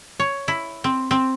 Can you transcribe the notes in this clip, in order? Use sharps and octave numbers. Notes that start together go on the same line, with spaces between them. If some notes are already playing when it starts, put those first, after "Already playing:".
C#5
E4
C4
C4